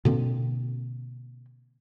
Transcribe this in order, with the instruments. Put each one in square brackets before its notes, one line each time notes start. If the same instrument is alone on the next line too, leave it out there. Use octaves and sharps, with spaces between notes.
[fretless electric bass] B2 D3 A#3 C4